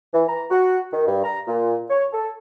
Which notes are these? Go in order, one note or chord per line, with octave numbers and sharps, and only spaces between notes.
E3
A#5
F#4
D#3
G2
A#5
A#2
C#5
A4